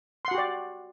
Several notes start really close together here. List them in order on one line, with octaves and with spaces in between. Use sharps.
C6 F#5 F#4 G4 D5